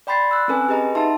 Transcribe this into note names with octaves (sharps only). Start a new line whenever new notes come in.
D5 G5 B5 C6 A6 C7
E6 F#6
C4 C#4 A4 B4 G#5
G4 G#4 B4 D#5 A#5
D#4 F#4 E5 A5 C6